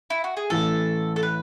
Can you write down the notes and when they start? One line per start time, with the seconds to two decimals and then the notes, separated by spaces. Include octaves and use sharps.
0.10 E4
0.24 F#4
0.37 G#4
0.50 A1 A2 E3 A3 A4
1.16 A4
1.23 B4